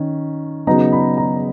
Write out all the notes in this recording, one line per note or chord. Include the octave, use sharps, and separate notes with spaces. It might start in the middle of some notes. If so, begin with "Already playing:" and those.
Already playing: D#3 C#4
C#3 F#3 B3 D#4 A#5
B5
A#5